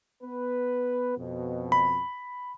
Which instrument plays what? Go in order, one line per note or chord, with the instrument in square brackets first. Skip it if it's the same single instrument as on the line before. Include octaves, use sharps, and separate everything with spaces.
[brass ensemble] B3 B4
F2 B2
[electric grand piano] B5